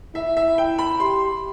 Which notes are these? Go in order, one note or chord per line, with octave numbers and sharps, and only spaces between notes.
E4 E5
E5
G5
B5
G4 C6